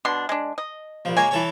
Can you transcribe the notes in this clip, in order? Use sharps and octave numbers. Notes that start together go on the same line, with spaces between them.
B2 D4 C6
G#3 D4
D#5
A#1 F3
G#3 A#3 C#5 G#5
E3 A4 C#5